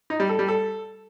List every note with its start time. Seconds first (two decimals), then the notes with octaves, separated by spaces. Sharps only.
0.10 D#4
0.20 G3
0.29 A4
0.39 G3
0.48 A4